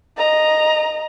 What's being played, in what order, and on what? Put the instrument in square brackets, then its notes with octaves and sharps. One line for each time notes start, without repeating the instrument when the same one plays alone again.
[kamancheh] D#5 A#5